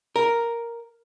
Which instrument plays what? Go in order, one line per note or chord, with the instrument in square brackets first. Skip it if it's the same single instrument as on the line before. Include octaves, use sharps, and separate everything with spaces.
[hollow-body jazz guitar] A#4